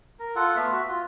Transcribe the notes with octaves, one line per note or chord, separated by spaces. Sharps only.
A#4
F4 A4 F#5
A3 B3 E5 F5
F#4
F4